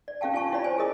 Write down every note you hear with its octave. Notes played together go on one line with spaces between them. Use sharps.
D5
C#4 G4 F5 G5 A5
F4 G#5 A5 C#6
E4 F4 G4 C#5 D5 B5
C5 G#5
G#4 A#4 D#5 D#6